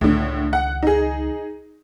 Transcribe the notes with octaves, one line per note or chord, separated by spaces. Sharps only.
C#2 A2 D3 D#3
F#5
D#4 G#4